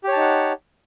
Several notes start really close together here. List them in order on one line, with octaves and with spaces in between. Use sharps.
G4 C#5 A5 D#4 F#5